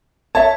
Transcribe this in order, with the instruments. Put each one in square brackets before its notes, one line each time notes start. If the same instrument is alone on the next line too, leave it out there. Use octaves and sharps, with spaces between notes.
[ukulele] C#5 E5 [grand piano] A5